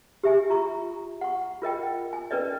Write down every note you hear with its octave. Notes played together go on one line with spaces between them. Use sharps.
G4 E5 G#5
F4 A#5 C#6
F#5 C#6
F4 A#4 D#5 G5
G#5
C#4 A#4 B4 D5 D#5